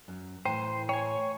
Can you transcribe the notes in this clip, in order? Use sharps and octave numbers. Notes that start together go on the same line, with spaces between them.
F#2
A2 E3 C5 G5
C#5 G5 G#5